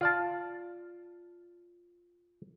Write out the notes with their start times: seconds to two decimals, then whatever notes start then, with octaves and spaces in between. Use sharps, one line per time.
0.01 F4 D5 A5